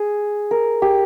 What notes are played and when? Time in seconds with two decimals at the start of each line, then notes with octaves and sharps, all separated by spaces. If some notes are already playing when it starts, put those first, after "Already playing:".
Already playing: G#4
0.51 A#4
0.82 G4